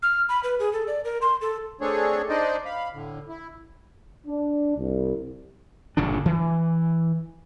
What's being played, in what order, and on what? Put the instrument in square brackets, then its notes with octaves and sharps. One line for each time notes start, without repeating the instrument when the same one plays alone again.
[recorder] F6
B5
B4
G#4
A4
D5
A#4
C6
A4
[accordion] A3 C4 D4 G#4 A4 C#5
D4 D#4 C5 D5 D#5
F5 B5
A2 D3
E4
[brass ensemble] D4
C2
[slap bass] G1 A#2 C#3 D4
E3